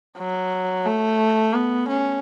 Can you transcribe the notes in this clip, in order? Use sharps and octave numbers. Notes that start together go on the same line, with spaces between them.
F#3
A3
B3
C#4